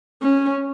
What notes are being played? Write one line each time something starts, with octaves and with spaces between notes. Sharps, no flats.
C#4